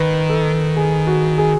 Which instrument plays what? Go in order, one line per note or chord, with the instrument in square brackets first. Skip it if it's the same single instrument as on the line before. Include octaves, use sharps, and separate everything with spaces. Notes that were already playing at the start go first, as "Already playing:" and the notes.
Already playing: [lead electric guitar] D#3 [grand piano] B4
[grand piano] A4
G#4
F#4
G#4